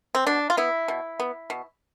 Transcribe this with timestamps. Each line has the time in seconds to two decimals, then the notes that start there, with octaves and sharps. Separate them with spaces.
0.15 C4
0.27 B2 D4
0.50 F4
0.57 B3 E4
0.88 B2
1.20 B3
1.50 B2